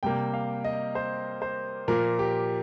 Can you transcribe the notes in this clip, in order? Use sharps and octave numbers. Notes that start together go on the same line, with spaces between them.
C3 G3 A#3 G5
F5
D#5
C5
C5
A#2 F3 A#3 A#4
G4